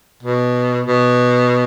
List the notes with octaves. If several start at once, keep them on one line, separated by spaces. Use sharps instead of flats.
B2
B2